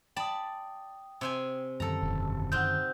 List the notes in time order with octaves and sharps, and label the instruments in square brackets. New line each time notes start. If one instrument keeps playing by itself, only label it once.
[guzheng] D5 A5 B5 [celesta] G5 D#6
[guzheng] C3 C5 G#5
[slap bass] F#2 D3 D#3 [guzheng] A4 A#5
[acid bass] E1
[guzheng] C4 D#4 [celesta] F#5 F#6 G6